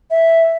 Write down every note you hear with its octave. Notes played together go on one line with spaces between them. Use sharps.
E5